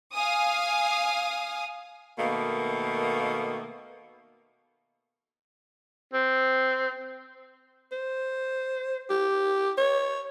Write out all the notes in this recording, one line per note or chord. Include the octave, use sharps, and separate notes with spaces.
F5 G#5 D#6
B2 D#3 A3 A#3
C4
C5
G4
C#5